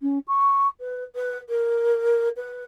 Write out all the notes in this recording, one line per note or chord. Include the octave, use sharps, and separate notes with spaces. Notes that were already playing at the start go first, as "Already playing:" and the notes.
C#4
C#6
B4
B4
A#4
B4